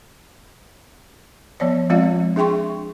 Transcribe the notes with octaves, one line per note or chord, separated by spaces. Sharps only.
F3 B3 C#5 D5
F3 G#3 C4 F4 D5 F5
D4 G#4 E5 G5 C6 C#6